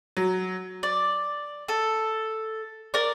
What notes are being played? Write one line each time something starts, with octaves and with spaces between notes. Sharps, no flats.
F#3
D5
A4
A#4 D5